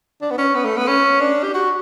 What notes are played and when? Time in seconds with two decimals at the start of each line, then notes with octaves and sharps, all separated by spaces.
0.22 D4
0.30 B3
0.38 C#4
0.55 B3
0.65 A3
0.77 B3
0.87 C#4
1.21 D4
1.43 G4
1.54 F#4